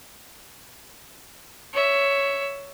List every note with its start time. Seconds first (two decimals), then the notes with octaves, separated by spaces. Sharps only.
1.73 C#5 E5